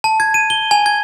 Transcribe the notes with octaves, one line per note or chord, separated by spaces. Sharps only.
A5
G#6
D#7
G7
G#5
G#6